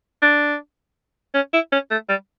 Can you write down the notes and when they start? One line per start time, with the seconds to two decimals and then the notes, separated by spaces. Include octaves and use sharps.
0.22 D4
1.35 C#4
1.54 E4
1.72 C#4
1.91 A3
2.09 G3